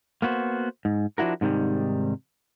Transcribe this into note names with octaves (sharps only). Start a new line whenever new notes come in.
A#3 B3 F#4 C5
G#2
F3 D4 E4 F#4 A#4
G#2 C3 D#3 G3